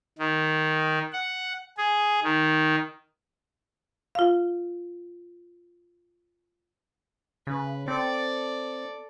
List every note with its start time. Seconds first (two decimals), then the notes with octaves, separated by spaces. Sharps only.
0.19 D#3
1.13 F#5
1.78 G#4
2.23 D#3
4.15 F4 F5
7.47 C#3 B4
7.88 C4 A4 D5